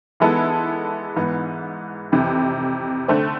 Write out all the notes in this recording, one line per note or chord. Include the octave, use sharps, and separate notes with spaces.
E3 G#3 B3 E4 A4
G#2 E3 B3
F2 C3 E3
D3 A3 C4